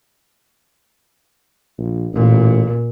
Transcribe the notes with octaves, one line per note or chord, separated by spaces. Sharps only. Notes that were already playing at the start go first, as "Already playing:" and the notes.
A#1
A1 A#2